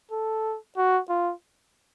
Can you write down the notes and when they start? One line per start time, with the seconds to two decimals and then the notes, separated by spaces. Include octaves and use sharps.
0.11 A4
0.77 F#4
1.09 F4